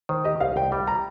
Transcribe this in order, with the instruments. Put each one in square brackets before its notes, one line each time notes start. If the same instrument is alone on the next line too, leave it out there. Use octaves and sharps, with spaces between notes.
[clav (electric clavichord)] D#3 [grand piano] C5
[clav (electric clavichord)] G4 [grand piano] D#5
[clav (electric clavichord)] C2 [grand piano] F5
[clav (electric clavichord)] C2 [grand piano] G5
[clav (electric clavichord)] G3 [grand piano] G5
[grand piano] A#5